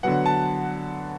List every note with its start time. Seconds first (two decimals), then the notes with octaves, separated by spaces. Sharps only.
0.03 D3 F#3 B3 F#5
0.26 A5